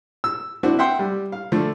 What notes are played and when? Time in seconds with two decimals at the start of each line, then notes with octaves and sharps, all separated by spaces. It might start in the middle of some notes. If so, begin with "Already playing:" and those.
0.24 E6
0.63 C4 D4 E4 F#4
0.79 E5 F#5 G5 C6
0.99 G3
1.32 F5
1.52 D3 F3 A3